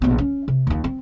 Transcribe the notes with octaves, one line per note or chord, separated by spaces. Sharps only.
A#1 B2
C#4
C3
D#2 F4
C4